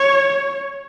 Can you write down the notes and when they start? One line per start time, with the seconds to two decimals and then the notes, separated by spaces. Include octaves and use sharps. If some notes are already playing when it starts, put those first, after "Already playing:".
Already playing: C#5